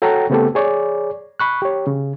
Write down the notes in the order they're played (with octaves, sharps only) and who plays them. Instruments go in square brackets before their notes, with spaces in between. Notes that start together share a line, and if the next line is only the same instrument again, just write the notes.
[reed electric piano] F#4 A4 C#5 F#5 G5 A#5
C#3 A3 B3 C4 G4 A4
G#4 C#5 D5
B5 C#6 F#6
G4 C#5
C#3